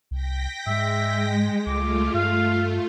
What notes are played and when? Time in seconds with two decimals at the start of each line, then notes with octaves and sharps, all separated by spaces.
0.11 C2 G5 A#6 B6
0.66 G#2 G#3 E5
1.66 C#2 A3 F4 D6
2.14 G2 F5